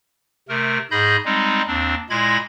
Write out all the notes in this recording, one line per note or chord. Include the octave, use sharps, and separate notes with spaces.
C3 A3 A#4
G#2 G#4 D#5 B5 G6
G3 G#3 C4 D#4
D#2 C4 D4
A#2 G#3 E4 B5 G#6 A#6